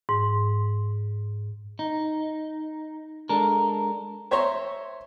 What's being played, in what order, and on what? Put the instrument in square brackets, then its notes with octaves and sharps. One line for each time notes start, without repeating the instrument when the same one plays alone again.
[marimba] G#2
[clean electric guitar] D#4
G#3 D4 A4 A#4
[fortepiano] C5 C#5 E5 A#5 C6 C#6